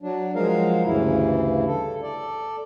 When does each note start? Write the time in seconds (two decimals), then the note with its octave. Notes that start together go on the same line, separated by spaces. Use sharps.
0.02 F#3 D4
0.35 F3 F#3 G#3 A#4 F5
0.85 D2 G2 C#3 E3 E4
1.67 A4
2.03 A4 D5